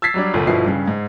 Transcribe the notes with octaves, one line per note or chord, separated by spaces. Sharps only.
E6 G#6 A6 B6 C7
F#3 G3 D4
G1 C2 A#2 D3
G1 B2 F3 E4 C7
G2 C#3
G#2